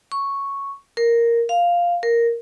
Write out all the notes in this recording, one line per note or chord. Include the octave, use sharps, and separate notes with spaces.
C#6
A#4
F5
A#4